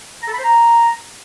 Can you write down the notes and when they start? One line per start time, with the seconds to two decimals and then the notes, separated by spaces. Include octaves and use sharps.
0.22 A#5
0.28 A4
0.33 B5
0.39 C5
0.44 A#5